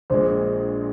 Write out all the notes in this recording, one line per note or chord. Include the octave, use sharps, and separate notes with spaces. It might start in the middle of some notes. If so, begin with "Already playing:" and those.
A#1 A#2 G#3 C5